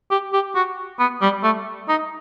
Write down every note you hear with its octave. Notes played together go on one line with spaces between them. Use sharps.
G4
G4
F#4
B3
G3
A3
D#4